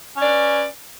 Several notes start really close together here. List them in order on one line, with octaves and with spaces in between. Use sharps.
C#4 D5 B4